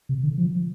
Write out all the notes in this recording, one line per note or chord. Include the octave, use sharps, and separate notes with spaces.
C3
D3
F3